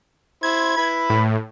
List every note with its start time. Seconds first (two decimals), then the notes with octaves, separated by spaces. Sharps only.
0.43 E4 C5 G#6
0.77 E4 B4 B5
1.10 A2